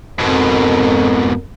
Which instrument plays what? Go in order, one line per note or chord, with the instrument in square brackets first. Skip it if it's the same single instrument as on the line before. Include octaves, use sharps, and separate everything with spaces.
[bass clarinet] F2 [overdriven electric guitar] G#2 B2 [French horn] A#4